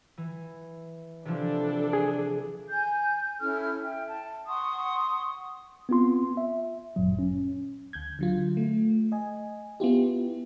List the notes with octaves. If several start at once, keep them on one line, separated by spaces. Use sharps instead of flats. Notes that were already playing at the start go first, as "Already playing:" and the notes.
E3
C3 E3 F3 D4 A4
G#4
G#5 G6
C#4 E4 A4 F6
E5 G5
A5
F#5 C6 C#6 D#6
B3 C4 F4 C6
E5
G1 F#2 A#2 F#3
C#4
D2 G6 G#6
D3 F#3 F4
A3
D#5 G#5
B3 E4 F4 G4